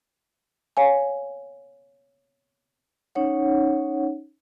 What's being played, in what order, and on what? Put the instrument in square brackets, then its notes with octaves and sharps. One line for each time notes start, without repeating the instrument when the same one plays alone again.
[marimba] C#5 F5 G#5
[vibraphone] C#4 D#4 C#5 F#5